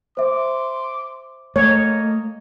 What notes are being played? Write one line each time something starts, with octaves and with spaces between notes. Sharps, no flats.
C5 E5 C6 D6
A3 A#3 C#5 D#5